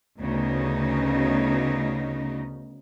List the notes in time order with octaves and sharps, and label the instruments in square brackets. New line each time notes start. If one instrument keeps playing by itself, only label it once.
[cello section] D2 C#3 B3 D#4